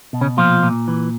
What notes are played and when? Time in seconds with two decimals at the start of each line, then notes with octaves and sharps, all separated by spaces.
0.13 B2
0.21 C#3 C#4
0.37 A#2 F3 F4
0.63 A#2
0.88 E3